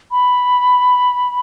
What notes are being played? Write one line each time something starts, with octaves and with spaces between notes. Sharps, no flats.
B5